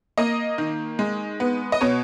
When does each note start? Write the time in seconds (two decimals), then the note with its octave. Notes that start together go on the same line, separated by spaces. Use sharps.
0.17 A#3 D#5
0.58 D#3
0.99 G#3
1.40 B3
1.72 D#5
1.81 B2 C#5